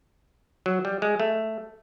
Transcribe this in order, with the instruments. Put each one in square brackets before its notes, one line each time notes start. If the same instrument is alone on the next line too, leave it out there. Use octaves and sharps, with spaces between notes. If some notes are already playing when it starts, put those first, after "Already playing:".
[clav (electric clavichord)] F#3
G3
G#3
A3